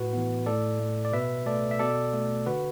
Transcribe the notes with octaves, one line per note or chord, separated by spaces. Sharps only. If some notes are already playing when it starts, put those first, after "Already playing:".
Already playing: A2 F#4 B4
E3 B3
A2 A4 D5
A3
D5
B2 B4 E5
A3 A4 D5
E5
B2 A4 D5
A3
D3 F#4 B4